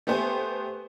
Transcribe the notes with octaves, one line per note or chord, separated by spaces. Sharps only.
A3 B3 G4 C5 G#5